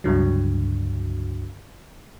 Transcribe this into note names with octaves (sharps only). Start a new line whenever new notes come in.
C#2 G2 D3 F#3